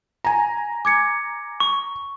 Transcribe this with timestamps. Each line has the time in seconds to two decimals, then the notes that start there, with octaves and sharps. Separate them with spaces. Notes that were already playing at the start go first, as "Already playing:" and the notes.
0.25 G#5 A#5
0.85 D6 G#6 C#7
1.60 C#6